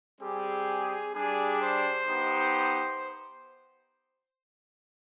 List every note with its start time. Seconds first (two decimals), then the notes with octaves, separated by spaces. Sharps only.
0.21 G3 C4 G4 G#4
1.14 G3 D4 G4 G#4
1.61 C5
2.08 B3 D#4 G4